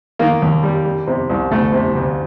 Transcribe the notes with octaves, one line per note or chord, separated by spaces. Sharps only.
D#3 A#3
D#2
G3
G3
C3
C2
D2 A3
C3
D2